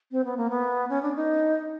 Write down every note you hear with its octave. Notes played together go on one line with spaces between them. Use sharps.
C4
B3
A#3
B3
C#4
D4
D#4